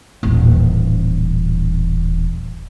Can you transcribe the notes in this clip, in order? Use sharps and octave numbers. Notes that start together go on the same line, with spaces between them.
D#1 A1